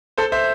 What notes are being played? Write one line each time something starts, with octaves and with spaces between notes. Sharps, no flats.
A4 C5
C5 E5